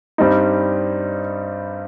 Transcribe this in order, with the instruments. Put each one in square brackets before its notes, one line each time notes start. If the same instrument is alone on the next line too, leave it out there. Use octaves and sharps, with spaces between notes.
[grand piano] G2 G3 C4 D#4